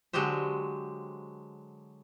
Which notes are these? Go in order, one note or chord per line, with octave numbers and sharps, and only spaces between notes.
D3 F#3 G#3 F#4 G4 C5